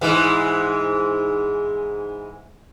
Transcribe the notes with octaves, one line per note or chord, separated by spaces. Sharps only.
G#2 E3 G#3